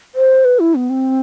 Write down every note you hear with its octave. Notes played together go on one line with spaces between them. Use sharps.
C5
B4
E4
B3
C4